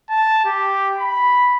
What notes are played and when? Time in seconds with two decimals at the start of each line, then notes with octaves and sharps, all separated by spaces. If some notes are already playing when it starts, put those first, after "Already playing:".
0.10 A5
0.45 G4
0.98 B5